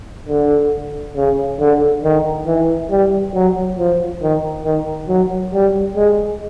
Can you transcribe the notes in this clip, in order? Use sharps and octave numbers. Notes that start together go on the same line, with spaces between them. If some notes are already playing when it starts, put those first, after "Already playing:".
D3
C#3
D3
D#3
E3
G3
F#3
F3
D#3
D#3
F#3
G3
G#3